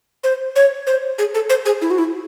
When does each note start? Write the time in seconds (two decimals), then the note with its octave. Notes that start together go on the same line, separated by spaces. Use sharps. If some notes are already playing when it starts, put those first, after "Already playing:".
0.24 C5
0.56 C#5
0.87 C5
1.18 G#4
1.34 A4
1.50 C5
1.65 G#4
1.81 E4
1.90 F#4
1.98 E4